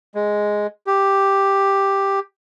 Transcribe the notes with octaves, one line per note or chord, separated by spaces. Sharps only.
G#3
G4